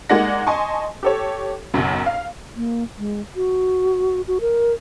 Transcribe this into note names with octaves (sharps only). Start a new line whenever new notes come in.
G#3 A#3 D#4 D5 F#5 A#6
D#5 G#5 A5 C6 C#6
G4 A4 C#5
F#1 B1 F#2
F5
A#3
G#3
F#4
F#4
A#4